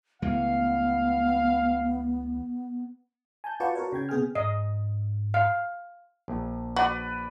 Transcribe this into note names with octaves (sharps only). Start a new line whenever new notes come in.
C#2 E3 A3 B3 F5
G#5 A5 G6
F4 F#4 B4 D5 A5 C#6
F#4 A#4 B4 C#5
C#3 G5 G#6
C3 B3 G#4 G5 G#5 F6
G#2 D#5
F5
A#1
F#4 B4 D5